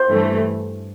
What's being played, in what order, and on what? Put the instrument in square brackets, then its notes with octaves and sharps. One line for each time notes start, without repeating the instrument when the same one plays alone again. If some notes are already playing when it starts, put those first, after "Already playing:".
Already playing: [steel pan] C5
[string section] G2 E3 A3